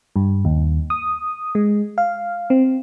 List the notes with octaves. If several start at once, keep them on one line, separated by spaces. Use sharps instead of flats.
G2
D#2
D#6
G#3
F5
C4